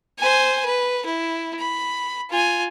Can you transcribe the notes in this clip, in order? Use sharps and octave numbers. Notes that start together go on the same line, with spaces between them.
C5 G#5
B4
E4
B5
F4 G#5